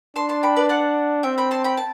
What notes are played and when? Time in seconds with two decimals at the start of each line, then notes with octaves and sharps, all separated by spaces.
0.16 D4 A5 C6
0.29 A5 C6
0.43 G5 B5
0.56 B4 D5
0.69 D5 F#5
1.23 C4 E5 G5
1.38 G5 B5
1.51 A5 C6
1.64 G5 B5
1.77 A5